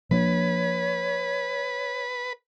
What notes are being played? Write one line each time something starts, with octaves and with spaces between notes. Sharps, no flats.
F3 A#3 D4 B4 C#5